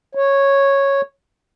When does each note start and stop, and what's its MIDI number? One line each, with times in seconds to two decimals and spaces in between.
0.15 1.01 73